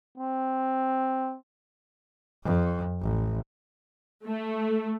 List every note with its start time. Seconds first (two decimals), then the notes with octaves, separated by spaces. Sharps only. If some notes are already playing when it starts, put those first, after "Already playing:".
0.18 C4
2.44 F2
3.01 A1
4.25 A3